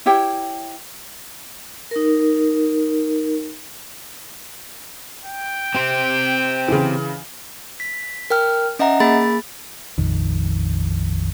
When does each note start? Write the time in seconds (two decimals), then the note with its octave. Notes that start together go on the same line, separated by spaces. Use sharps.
0.06 E4 G4 C#5 G5
1.91 D#4 A#4
5.25 G5
5.75 C4 G4 C5
6.68 C#3 E3
7.80 B6
8.30 A#4 G5 F6
8.79 C#4 D#5 E5 F#5 A#5
9.00 A#3 G#4 B5 A6
9.98 A#1 F2 D#3